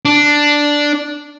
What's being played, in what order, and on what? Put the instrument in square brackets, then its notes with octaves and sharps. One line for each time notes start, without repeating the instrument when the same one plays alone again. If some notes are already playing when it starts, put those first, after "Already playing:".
[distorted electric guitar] D4